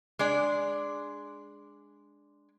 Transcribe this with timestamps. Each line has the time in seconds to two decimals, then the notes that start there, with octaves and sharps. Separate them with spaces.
0.19 G#3 D4 D5